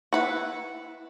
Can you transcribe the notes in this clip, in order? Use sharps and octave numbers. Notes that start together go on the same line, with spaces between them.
E4 B4 F#5